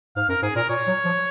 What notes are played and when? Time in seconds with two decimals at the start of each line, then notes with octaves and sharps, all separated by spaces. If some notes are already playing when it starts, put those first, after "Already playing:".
0.16 G#2 F5
0.29 F#2 A#4
0.42 G#2 G#4
0.56 A#2 A#4
0.69 A#2 C#5
0.87 F#3
1.05 F3